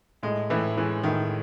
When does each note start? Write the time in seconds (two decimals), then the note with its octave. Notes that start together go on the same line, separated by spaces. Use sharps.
0.23 A2 G#3
0.50 A2 E3
0.77 E3 G#3
1.03 A2 D#3